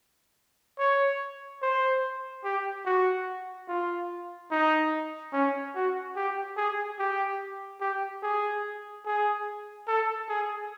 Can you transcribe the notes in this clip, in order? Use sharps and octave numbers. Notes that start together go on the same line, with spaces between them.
C#5
C5
G4
F#4
F4
D#4
C#4
F#4
G4
G#4
G4
G4
G#4
G#4
A4
G#4